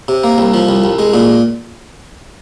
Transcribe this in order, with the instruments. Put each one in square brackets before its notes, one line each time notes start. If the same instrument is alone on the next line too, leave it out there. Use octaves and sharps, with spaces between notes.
[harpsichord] C3
A#3
C2
F3
C2
C2
G#3
A#2